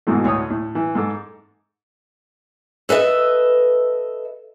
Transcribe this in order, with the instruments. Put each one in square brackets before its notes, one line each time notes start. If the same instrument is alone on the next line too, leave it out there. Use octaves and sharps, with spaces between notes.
[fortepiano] G#1 G#2 B2 E3 A3
D2 A2 C#5 D#6
A2
E3
G#2 A4 D6
[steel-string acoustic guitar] A4 B4 D#5 E5